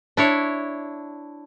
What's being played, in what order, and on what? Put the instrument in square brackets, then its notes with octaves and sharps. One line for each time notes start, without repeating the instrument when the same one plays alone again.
[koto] D4 E4 C#5